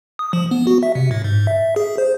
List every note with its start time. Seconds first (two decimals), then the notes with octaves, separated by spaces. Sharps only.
0.19 D#6
0.33 F3
0.51 B3
0.67 F#4
0.83 E5
0.95 C3
1.11 A2
1.24 G#2
1.47 E5
1.60 E5
1.76 G#4
1.98 C5